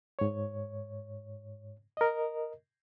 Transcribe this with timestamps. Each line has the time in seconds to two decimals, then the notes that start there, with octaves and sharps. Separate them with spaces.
0.19 G#2 C#5
1.97 A#4 D#5